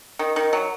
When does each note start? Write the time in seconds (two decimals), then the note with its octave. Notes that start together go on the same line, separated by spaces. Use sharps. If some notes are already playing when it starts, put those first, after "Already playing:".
0.19 D#3
0.36 D#3
0.53 F#3